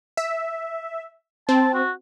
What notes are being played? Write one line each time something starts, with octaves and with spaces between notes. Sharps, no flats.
E5
C4 A5
F#4